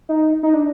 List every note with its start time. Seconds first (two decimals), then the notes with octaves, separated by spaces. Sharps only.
0.09 D#4
0.43 D#4
0.54 D4